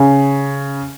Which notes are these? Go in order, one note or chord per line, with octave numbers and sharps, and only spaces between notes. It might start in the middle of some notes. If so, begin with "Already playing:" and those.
Already playing: C#3